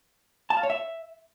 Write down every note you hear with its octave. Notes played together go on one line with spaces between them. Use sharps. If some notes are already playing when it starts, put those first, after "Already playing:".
A5
F5
C#5
E5